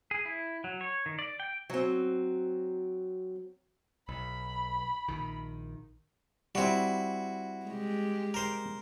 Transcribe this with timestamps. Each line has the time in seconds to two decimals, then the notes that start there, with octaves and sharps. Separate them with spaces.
0.11 G#4
0.25 E4
0.64 F#3
0.81 C#5
1.06 D#3
1.19 D5
1.40 G5
1.70 F#3 C4
4.09 B1 B5
5.08 A#1 D#3
6.55 G3 C4 E4 F#4
7.66 G#3 G4
8.34 A#4 C5